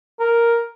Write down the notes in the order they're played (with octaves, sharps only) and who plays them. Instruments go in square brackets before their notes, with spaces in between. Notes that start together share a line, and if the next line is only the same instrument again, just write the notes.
[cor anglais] A#4